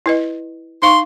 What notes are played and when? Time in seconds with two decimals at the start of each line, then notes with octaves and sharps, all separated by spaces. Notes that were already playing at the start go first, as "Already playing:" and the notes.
0.06 E4 B4 D#5
0.82 D#4 F5 C6 C#6